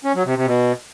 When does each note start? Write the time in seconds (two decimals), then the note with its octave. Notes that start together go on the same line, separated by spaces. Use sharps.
0.05 C#4
0.15 F#3
0.26 C3
0.36 C3
0.47 B2